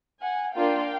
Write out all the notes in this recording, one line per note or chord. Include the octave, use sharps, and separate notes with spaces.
F#5 G#5
A#3 D4 F4 F5 G5